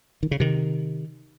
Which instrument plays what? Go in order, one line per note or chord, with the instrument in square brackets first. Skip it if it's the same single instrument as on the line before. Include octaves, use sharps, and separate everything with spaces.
[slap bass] D#3
C#3
C3 D#3